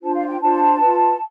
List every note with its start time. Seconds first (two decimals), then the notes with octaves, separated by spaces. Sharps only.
0.02 D4 F4 C5 A5
0.15 F5
0.28 G5
0.40 D4 F4 C5 A5
0.79 F4 B4